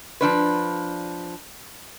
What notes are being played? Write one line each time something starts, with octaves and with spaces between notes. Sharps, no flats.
F3 D4 B4